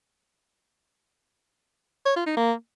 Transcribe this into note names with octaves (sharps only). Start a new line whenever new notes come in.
C#5
F4
D#4
A#3